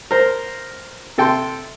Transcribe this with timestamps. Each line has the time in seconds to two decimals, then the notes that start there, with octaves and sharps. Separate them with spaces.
0.11 A#4 C5
1.18 C3 A4 G5 A5 C6